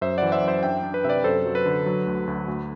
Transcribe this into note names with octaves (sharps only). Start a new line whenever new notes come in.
F#2 C5 E5
E3 D5 F#5
C5 E5
F#2
C5 E5
D4 E5 G5
D4
B4
C3 B4 D5 E5
F#2 A4 C5
F#3
B4
D3
F#3
D2
D2
D2